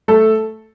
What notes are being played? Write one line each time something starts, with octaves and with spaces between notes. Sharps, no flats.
A3 A4